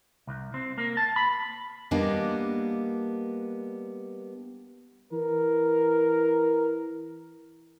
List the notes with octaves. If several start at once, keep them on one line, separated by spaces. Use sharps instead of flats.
C2
C4
A#3
A5
B5
G3 A#3 B3 D4 D#5
E3 A#4